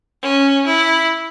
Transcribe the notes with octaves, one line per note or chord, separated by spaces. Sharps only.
C#4
E4